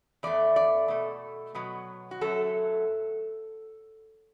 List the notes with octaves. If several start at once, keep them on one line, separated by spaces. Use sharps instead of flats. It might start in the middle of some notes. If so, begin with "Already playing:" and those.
E2 E3 A3 D5
D5
B2 A3
B2 F#3 B3
F#4
F#2 F#3 A3 A4